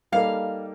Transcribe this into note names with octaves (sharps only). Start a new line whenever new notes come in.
G3 A#3 D#4 A4 F5